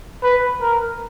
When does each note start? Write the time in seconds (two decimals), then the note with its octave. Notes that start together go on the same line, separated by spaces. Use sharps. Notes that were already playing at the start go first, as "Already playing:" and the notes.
0.23 B4
0.61 A#4